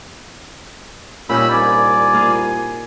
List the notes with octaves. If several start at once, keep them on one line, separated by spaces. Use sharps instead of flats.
A#2 G3 C#4 D#4 B5 E6
C2 G3 D5 G#5
A#3 F4 G#4